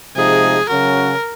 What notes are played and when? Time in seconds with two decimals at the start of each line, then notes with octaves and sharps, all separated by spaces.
0.16 C3 F3 G#3 D#4 G#4
0.69 C#3 F#3 C#4 F#4 A#4